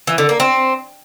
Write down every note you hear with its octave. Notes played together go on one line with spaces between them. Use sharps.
E3
D3
A#3
C4